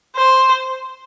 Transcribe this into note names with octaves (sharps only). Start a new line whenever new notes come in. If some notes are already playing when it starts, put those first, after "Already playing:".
C5